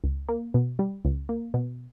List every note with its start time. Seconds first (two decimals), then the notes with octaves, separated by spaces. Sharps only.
0.04 C#2
0.29 A#3
0.54 B2
0.79 G3
1.05 C#2
1.29 A#3
1.54 B2